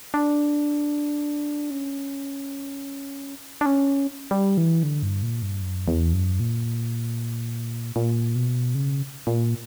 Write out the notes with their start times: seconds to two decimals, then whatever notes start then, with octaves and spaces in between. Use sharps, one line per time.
0.14 D4
1.71 C#4
3.61 D4
3.66 C#4
4.31 G3
4.57 E3
4.83 D3
5.03 G2
5.23 A#2
5.42 G2
5.62 F#2
5.88 E2
6.13 F#2
6.40 A#2
7.96 A#2
8.35 B2
8.75 C#3
9.27 A#2